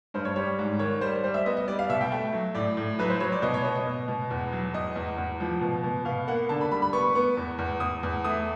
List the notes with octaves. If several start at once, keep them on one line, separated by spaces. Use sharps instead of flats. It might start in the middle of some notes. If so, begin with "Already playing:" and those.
G2 C5
C#5
G3 C#5
G#2
D#3 C#5
G3 C5
G3 C5
E5
B3 D#5
D#5
G3 D5
F5
B2 E5
G5
A3
F#3
A2 D5
A2
F#3 B4
C5
F#3 C#5
D5
B2 D#5
C#5
B2 D#5
D#5
B2
B2
E2
F#3
E2 D#5
E2
E2
F3
B2
B2
B2 F5
A#3 F#5
D3 A5
B5
G3 B5
B5
B3 C#6
B3
E2
E2
E2 D#6
E2
A3 D#6